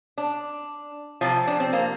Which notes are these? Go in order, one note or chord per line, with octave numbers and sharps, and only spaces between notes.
D4
C3 F3 F4
D4
C4
A#3